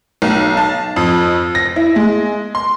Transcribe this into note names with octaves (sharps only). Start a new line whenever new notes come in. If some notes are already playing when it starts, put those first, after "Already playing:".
B1
A5
F2
A#6
E4
G#3
C6